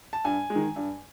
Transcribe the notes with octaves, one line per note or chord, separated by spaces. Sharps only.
A5
G2 G#5
G#3
D#3
G2